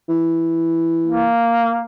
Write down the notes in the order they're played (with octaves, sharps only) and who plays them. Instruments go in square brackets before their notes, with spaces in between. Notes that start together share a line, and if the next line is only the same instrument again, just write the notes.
[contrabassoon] E3
[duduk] A#3